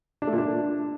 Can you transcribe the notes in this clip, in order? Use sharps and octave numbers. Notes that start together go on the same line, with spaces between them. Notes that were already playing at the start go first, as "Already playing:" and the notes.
D4
A3
A#2
D4